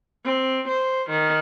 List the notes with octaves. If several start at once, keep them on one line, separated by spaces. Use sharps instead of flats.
C4
C5
D#3